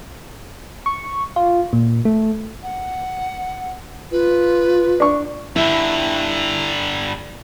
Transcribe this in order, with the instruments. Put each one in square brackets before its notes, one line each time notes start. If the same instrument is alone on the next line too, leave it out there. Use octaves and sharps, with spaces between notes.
[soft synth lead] C#6
F4
A#2
A3
[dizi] F#5
[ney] F4 [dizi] B4
[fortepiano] D4 C#6
[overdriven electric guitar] G2 D3 [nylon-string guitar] E4